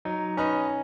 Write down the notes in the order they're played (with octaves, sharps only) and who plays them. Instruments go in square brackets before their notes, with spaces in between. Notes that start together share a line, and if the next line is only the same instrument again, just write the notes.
[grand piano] F#3 [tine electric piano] D#4
[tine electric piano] C#4 [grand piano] D#4 B4 D#5